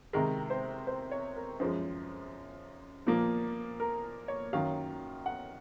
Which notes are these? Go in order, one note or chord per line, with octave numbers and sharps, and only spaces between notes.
C3 D#3 G#3 A#4
C5
C5
C#5
A#4
F#2 F3 G#3 C5
A#2 F3 A#3
A#4
C#5
F#2 D#3 F#3 F5
F#5